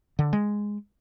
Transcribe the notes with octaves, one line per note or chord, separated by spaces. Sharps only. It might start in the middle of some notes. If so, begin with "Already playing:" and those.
D3
G#3